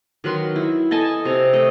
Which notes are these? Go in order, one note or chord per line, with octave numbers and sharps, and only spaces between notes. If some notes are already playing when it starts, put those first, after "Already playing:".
D#3 F#3 B4 C6
E4
A4 D#5 G#5 A5
C3 A#5
A3 D#5